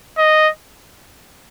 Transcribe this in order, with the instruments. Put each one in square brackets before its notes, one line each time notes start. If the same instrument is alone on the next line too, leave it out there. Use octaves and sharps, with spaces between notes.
[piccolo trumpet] D#5